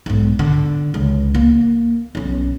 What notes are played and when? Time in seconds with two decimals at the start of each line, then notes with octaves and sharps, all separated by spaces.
0.06 B1 G#2
0.39 D3
0.94 C#2
1.35 A#3
2.15 B1 C#4